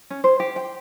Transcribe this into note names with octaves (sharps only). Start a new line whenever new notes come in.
C#4
C5
G4
G5